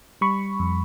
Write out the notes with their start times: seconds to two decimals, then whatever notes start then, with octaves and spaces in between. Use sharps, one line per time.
0.21 G3 B5 C#6
0.60 F2